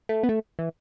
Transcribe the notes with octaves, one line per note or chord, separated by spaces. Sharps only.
A3
B3
A3
E3